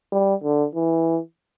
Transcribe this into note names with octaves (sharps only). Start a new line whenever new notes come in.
G3
D3
E3